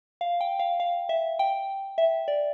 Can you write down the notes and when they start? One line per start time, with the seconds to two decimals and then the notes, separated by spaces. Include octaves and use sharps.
0.21 F5
0.41 G5
0.59 F5
0.80 F5
1.09 E5
1.39 G5
1.98 E5
2.28 D5